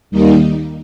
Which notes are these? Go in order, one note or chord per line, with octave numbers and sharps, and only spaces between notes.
D#2 D#3 G3 A#3 D#4